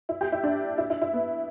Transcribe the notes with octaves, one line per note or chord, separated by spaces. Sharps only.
E4
G4
E4
D4
E4
E4
E4
B3